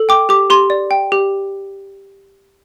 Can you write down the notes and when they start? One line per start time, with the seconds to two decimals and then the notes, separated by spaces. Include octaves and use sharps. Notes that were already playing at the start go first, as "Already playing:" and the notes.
Already playing: A4
0.09 G5 D6
0.29 G4 D6
0.50 G4 C6
0.70 D5
0.91 G5
1.12 G4